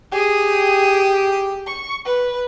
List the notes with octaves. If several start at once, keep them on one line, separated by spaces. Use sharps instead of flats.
G4 G#4 D#6
C#6 C#7
B4